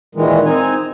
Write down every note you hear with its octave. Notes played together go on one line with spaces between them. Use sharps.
A#2 D#3 E3 G#3
C4 D#4 G#5